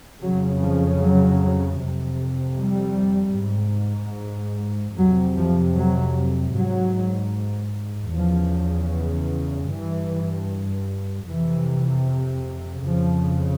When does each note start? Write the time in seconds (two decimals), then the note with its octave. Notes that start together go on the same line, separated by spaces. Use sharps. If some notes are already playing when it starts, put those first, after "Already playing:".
0.22 F2 C#3 F#3
0.62 F3
1.01 F#3
1.81 F2 C3
2.60 G3
3.39 G#2
4.97 F2 C3 F#3
5.36 F3
5.76 F#3
6.56 G#2 F#3
8.13 E2 C#3 F3
9.71 G2 E3
11.30 F2 C3 E3
12.87 F2 C#3 F3